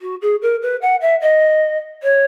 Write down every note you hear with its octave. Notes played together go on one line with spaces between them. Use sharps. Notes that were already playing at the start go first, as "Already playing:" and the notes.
F#4
G#4
A#4
B4
F#5
E5
D#5
C#5